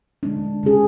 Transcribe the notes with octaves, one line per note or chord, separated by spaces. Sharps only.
D3 G#3 D4
C#3 G#3 C#4 G#4